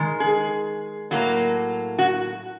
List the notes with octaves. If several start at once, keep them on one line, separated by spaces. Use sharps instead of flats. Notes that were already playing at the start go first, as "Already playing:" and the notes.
Already playing: D#3 G#3
G#4
A2 F#3 A#3
F#4